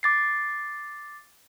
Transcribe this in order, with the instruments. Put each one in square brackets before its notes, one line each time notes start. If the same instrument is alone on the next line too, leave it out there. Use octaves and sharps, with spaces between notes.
[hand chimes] D6 A6 C7